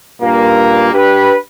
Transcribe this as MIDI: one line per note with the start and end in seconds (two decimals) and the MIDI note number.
0.22 0.89 43
0.22 0.89 46
0.22 0.89 58
0.93 1.35 62
0.93 1.35 67
0.93 1.35 71